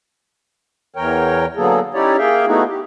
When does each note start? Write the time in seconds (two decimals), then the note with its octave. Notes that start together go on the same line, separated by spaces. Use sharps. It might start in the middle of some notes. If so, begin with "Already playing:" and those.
0.96 E2 E3 A#4 C#5 G5
1.56 D3 F#3 A#3 B3 G#4 A4
1.94 C#4 D#4 E4 G4 C#5 D5
2.18 A#3 G#4 E5 F5 G5
2.46 A3 B3 D#4 E4 F#4 G#4
2.67 G4